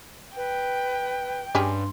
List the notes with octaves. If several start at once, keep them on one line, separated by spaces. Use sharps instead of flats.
B4 G5
G2 C#4 G4 G#4 C6